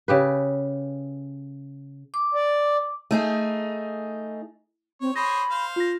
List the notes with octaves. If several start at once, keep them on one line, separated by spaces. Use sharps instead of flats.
C#3 G4 B4
D6
D5
A3 D#4 G#4
C4 C#5
G#4 C5 C#5 B5 A#6
C5 F5
F4 A#6